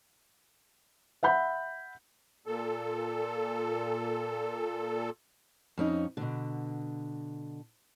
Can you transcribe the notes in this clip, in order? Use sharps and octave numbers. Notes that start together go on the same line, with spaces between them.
E5 F#5 B5 G6
A#2 A4
F2 C#4 D#4
B2 D3